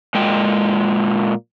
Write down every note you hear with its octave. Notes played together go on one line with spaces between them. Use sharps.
A#2 G#3 G5